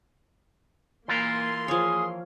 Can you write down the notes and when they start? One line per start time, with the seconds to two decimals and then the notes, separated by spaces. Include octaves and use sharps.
1.08 E3 A#3 F4 A#4 C6
1.68 F3 G#4 C#5